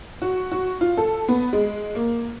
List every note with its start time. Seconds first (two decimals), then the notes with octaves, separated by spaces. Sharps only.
0.22 F#4
0.52 F#4
0.81 F4
0.97 A4
1.28 B3
1.53 G#3
1.95 A#3